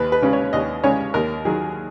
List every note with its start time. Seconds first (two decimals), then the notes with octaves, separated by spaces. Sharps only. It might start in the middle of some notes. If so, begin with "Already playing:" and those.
Already playing: D#2 B4
0.12 B4
0.22 C#3 G#3 C#4
0.33 C#5
0.53 D#2 D#5
0.84 C#3 G#3 C#4 C#5
1.14 D#2 A#4
1.45 D#3 F#3 G#4